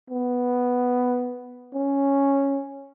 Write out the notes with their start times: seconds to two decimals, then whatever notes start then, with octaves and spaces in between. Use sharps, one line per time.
0.10 B3
1.74 C#4